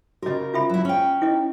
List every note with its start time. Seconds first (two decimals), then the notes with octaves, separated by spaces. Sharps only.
0.22 C#3 F#4 A#4 D#5
0.54 F4 E5 B5
0.69 F#3 E4
0.85 C#4 G5
1.22 E4 D#5